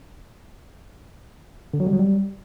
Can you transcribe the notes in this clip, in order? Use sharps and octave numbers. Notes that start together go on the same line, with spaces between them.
D3
F#3
G3
F#3
G3